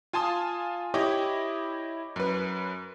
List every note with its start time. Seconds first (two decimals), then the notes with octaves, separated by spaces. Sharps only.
0.13 F4 G#5 A5 C6 D#6
0.94 E4 G4 C#5 D#5 D6
2.16 F#2 B4